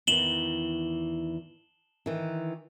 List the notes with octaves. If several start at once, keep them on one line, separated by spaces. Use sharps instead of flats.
E2 D#3 E3 E7 F#7 G7
D#3 E3